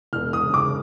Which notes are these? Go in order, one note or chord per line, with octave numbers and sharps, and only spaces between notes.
E1 F6
D#6
C#3
D6